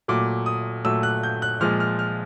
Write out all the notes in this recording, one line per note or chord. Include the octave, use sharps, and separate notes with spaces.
A#2 F#3 A3 D6
D#6
A#2 F#3 A3 E6
F#6
G6
F#6
A#2 F3 G#3 F6
F6
F6